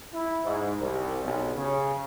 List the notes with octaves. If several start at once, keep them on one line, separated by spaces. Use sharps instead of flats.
E4
G#2
C2
B1
C#3